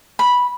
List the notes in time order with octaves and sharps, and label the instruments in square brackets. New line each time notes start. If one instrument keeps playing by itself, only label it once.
[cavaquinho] B5